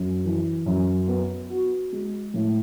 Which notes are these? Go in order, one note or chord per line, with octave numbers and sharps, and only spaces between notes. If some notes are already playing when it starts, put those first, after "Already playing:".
Already playing: F#2
E3
F#2
B3
F#4
G#3
A2